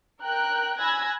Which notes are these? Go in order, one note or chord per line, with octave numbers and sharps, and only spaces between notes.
A#4 G5 F#6
G#5 B5 E6 F#6 G#6 A#6